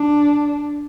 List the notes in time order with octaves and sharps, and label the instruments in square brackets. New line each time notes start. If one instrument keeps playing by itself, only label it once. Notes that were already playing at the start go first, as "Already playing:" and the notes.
Already playing: [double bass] D4